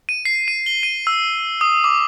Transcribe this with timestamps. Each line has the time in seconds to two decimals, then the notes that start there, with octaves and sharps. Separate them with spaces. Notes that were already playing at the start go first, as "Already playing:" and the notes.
0.09 D#7
0.25 C7
0.48 D#7
0.66 G7
0.83 D#7
1.07 E6
1.61 D#6
1.84 D6